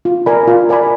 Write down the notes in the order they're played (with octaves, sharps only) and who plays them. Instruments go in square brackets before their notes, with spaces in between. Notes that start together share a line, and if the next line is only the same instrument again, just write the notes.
[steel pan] F4
A#4 D5 G#5 B5
F4
A#4 D5 G#5 B5